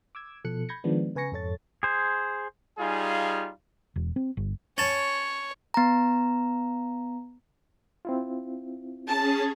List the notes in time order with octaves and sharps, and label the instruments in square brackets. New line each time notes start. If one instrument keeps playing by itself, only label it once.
[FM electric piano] D6 E6 G#6
B2 F3 A4 F#6 C#7
B5 G6 G#6 A#6 C#7
D#3 F3 G#3 B3 D4
C#3 B4 G#5 C#6 A#6 C#7
F2 G#2 A4 C#5 A6
[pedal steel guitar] G#4 C5
[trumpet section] G3 D#4 F4 G#4 F5 G#5
[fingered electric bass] E1
C4
G1
[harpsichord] C#4 A5 [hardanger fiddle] C#5
[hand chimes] B3 A#5
[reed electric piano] C4 E4 F4
[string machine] C#4 G#4 [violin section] A5